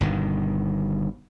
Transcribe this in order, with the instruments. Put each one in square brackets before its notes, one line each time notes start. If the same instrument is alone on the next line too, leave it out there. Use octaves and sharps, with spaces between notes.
[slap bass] G1 G2 B2 D#3